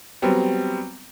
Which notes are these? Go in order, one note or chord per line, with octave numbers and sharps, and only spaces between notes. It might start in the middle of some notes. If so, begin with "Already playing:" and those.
F#3 G3 B3 C4